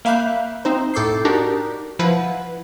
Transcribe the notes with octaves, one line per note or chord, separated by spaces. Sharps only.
A#3 E5 F5 B5 F#6 G6
C4 D#4 C5
A2 A4 D6 G6 C7
D4 D#4 F#4 G4 A#4
F3 E4 B4 F#5